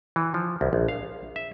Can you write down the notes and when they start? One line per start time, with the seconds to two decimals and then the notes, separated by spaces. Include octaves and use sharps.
0.16 E3
0.34 F3
0.61 C2
0.73 A#1
0.88 F5
1.36 E5